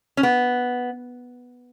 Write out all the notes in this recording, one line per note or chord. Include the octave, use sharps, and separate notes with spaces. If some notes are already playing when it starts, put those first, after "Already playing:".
C#4
B3